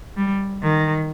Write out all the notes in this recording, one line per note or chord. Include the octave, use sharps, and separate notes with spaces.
G3
D#3